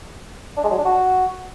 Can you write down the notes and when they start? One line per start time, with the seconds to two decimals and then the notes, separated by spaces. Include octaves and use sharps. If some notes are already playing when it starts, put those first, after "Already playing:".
0.57 D4
0.64 G#3
0.71 F#3
0.78 D4
0.85 F#4